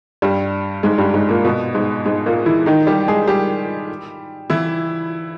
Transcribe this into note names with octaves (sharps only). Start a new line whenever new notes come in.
G2 G3
G#2 G#3
G2 G3
G#2 G#3
A#2 A#3
B2 B3
G#2 G#3
G#2 G#3
A#2 A#3
E3 E4
D#3 D#4
G3 G4
G#3 G#4
G3 G4
E3 E4